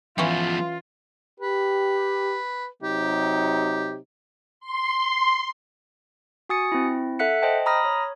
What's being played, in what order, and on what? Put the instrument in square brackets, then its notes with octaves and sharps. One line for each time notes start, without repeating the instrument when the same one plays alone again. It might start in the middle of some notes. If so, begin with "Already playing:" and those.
[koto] E3 C#4 [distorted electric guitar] F3 B3 [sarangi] F4
[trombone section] G4 [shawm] B4
[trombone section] C3 F#3 D#4 [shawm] G4
[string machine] C6
[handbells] F#4 G#5 D#6 A6 C#7
C4 E4
A4 E5 F#5 F#6 B6 C#7
C5 D#5 G5 A5
A#5 B5 D#6 F6 A#6
C#5